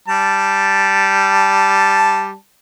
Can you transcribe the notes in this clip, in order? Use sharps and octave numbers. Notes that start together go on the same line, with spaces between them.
G3 A5